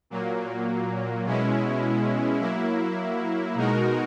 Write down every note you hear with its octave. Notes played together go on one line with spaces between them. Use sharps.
A#2 F#3 A#3
B2 G#3 C#4 E4
F#3 A#3 E4
B2 G#3 D#4 F#4 A#4